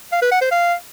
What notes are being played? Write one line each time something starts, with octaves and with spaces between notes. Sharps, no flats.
F5
B4
F#5
C5
F5